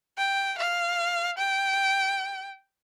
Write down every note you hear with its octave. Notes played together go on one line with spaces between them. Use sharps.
G5
F5
G5